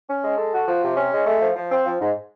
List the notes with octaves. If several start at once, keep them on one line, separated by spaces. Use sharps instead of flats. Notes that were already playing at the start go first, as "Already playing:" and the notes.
C#4
G#3
A4
F#4
F3
C3
C#4
G#3
A3
F3
F3
C4
F3
G#2